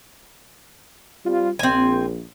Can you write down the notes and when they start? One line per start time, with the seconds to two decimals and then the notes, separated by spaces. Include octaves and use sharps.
1.26 G3 C4 F4
1.59 A#1 C4 G#5